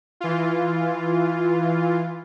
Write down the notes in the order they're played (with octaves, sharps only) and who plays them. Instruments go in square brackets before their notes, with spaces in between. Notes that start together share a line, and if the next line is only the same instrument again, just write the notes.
[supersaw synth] E3 F4